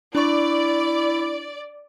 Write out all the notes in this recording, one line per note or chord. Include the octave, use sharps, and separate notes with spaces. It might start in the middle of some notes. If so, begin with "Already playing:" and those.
D4 E4 D5 C#6